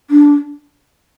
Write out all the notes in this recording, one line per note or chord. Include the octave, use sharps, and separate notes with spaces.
D4